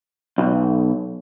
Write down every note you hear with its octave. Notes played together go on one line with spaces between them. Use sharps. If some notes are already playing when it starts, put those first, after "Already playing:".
B1